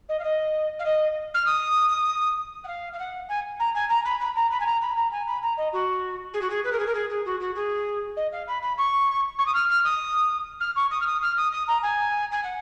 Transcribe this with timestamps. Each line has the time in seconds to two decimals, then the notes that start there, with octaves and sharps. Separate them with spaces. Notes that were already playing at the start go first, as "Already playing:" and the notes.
0.09 D#5
0.19 F5
0.24 D#5
0.79 F5
0.85 D#5
1.34 F6
1.46 D#6
2.64 F#5
2.67 F5
2.93 F5
2.99 F#5
3.28 G#5
3.59 A#5
3.74 G#5
3.89 A#5
4.05 B5
4.20 B5
4.35 A#5
4.51 B5
4.60 G#5
4.66 A#5
4.81 B5
4.96 A#5
5.11 G#5
5.27 B5
5.42 A#5
5.57 D#5
5.73 F#4
6.33 G#4
6.41 F#4
6.50 G#4
6.64 B4
6.72 A#4
6.79 G#4
6.86 A#4
6.94 G#4
7.10 G#4
7.25 F#4
7.40 F#4
7.55 G#4
8.16 D#5
8.32 F5
8.47 B5
8.62 B5
8.78 C#6
9.38 C#6
9.46 D#6
9.54 F6
9.69 F6
9.84 D#6
10.60 F6
10.76 C#6
10.91 D#6
11.00 F6
11.06 D#6
11.21 F6
11.36 D#6
11.52 D#6
11.67 A#5
11.82 G#5
12.31 G#5
12.43 F#5